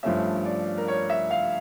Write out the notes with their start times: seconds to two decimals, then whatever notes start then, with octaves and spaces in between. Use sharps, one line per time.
0.03 G2 F3 A3 C#4 E5
0.45 D5
0.78 A#4
0.88 C#5
1.10 E5
1.30 F5